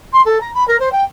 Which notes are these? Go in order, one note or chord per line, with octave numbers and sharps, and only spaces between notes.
C6
A4
A#5
B5
A#4
C5
G5